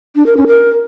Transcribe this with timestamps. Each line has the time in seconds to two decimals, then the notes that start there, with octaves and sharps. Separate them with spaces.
0.16 D4
0.26 A#4
0.37 C#4
0.47 A#4